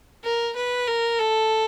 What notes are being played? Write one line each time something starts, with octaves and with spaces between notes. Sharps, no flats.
A#4
B4
A#4
A4